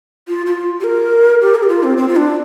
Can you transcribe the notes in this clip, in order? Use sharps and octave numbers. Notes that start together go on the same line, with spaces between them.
F4
F4
G4
A#4
G4
A#4
G4
F4
C4
C4
F4
D4